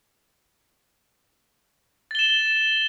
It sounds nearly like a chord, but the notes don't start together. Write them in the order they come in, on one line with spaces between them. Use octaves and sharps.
A6 G7 E7